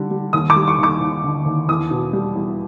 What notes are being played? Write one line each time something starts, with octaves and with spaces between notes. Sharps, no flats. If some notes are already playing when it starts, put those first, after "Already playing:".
Already playing: D3 G3
G3
D#2 D#6
D6
G3
C#6
D#2 D6
D#2
D3
D#2
E2 D#6
B2
G3
E2